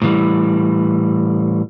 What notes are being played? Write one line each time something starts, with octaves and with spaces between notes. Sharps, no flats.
A2 E3 G3